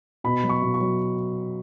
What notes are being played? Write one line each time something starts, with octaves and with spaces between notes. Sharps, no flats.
B2 B5
F#3
C#6
B2
C#6
F#3